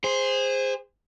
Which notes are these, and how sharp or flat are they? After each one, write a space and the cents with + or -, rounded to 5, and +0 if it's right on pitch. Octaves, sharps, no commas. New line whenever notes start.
G#4 -20 C5 +0